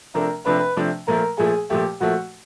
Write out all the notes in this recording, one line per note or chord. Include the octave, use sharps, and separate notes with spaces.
C3 F3 A3 D4 A#4
C3 F3 A3 D4 B4
C3 F3 A3 D4
A#2 F3 A3 A#4
A#2 F3 A3 G#4
A#2 F3 A3 G4
A#2 F3 A3 F#4